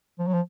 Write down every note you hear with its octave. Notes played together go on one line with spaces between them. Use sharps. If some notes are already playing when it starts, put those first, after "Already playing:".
F3
F#3
F3